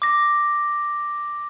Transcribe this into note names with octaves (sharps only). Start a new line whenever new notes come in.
D6 A#6